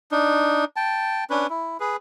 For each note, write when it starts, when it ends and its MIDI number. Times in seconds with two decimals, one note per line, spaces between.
0.12 0.65 62
0.12 0.65 63
0.76 1.24 79
0.76 1.24 81
1.30 1.47 61
1.30 1.47 62
1.30 1.47 71
1.50 1.77 64
1.80 1.96 68
1.80 1.96 71